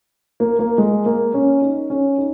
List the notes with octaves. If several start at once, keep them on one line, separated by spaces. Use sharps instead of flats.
A#3
A#3
G#3
A#3
C#4
D#4
C#4
D#4